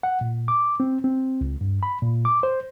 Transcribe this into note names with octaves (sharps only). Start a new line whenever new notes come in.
F#5
A#2
D6
C4
C4
C#2
G2
B5
A#2
D6
C5